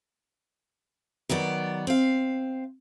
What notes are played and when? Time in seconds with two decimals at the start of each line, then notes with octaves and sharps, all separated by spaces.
1.29 D#3 F#3 B3 D5
1.87 C4 F5